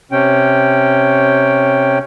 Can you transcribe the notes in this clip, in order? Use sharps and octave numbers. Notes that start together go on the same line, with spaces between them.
C3 C#4 G5